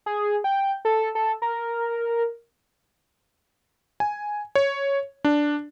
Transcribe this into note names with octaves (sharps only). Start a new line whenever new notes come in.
G#4
G5
A4
A4
A#4
G#5
C#5
D4